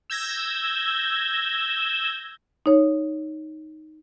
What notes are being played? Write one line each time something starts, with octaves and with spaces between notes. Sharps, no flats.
E6 G6 G#6 A#6
D#4 C#5